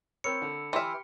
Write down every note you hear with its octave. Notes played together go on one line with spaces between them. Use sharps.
C4 A#4 C#5 B5 E6 C#7
D3
E3 G4 E5 G5 B5 C6 F6